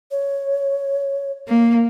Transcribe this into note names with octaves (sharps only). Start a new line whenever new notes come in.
C#5
A#3